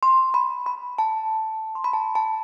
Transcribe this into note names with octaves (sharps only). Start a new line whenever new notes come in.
C6
B5
B5
A5
C6
B5
A5
A5